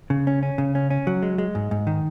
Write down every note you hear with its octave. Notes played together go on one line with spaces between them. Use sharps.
C#3
C#4
C#4
C#3
C#4
C#4
F#3
G#3
G#3
G#2
G#2
D#3